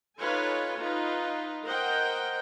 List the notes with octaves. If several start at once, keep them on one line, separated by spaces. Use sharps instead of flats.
D#4 F4 A4 B4 C#5 G#5
D#4 F4 B4
A#4 C5 D#5 F#5 G5